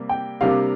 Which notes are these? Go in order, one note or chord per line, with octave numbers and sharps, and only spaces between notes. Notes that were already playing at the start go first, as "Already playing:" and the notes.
Already playing: C3 G3 A#3
G5
C3 G3 A#3 D4 F5